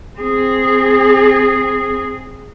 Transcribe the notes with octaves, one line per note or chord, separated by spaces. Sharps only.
C4 G#4